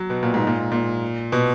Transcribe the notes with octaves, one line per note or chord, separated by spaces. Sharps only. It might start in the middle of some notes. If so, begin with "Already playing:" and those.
Already playing: F#3
B2
A#2
G#2
A#2
A#2
B2